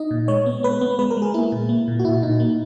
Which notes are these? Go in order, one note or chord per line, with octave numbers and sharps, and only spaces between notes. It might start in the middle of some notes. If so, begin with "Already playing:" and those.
Already playing: D#4 D#5
A#2
G#3 C#5
B3
B3 B4
B3
G#3 B4
A#4
G#3
G#4
A#3 E4
A#2
A#3
A#2
F#4
A#2 E4
A#2 D#4
A#3